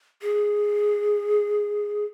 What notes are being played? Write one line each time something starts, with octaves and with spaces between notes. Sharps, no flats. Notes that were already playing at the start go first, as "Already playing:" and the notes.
G#4